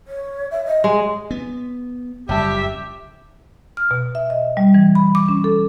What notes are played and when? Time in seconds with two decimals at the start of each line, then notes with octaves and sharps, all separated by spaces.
0.07 C#5
0.51 E5
0.66 D#5
0.84 G#3
1.31 B3
2.29 F#1 F2 C#3 G3 G4 E5 A5
3.77 F6
3.91 B2
4.15 E5
4.30 D#5
4.57 G3
4.74 E3
4.95 B5
5.15 D6
5.29 C#4
5.44 A4